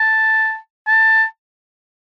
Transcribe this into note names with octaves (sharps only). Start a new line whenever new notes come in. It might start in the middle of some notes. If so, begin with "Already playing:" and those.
Already playing: A5
A5